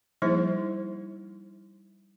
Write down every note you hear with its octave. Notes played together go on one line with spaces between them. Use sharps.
F3 G3 A#3 D#4 E4 C5